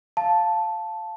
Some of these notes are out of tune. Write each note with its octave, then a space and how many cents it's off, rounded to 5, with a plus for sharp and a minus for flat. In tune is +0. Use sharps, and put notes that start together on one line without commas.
F5 +0 A5 +0